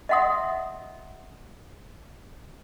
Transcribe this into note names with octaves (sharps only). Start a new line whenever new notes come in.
D#5 E5 F#5 C6 D#6